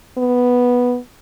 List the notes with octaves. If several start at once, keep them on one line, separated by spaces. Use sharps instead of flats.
B3